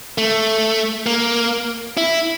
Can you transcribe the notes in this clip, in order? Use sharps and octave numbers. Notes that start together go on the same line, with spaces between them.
A3
A#3
E4